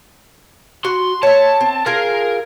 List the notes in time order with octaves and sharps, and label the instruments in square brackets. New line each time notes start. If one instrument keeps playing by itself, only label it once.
[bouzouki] F#4 [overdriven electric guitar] C6
[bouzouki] C#5 E5 [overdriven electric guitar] A5
[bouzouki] C4
[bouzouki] F4 G#4 [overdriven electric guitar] A#4